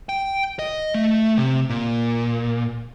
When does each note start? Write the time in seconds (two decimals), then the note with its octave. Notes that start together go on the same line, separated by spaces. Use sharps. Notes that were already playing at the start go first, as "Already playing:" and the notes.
0.09 G5
0.59 D#5
0.94 A3
1.37 C3
1.69 A#2